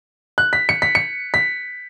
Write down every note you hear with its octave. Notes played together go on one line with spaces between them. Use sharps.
F#6
B6
C#7
B6
C#7
B6